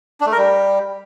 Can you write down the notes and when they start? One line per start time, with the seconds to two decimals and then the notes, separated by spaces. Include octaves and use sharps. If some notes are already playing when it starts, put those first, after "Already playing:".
0.20 D4
0.26 A3
0.32 A#4
0.38 G3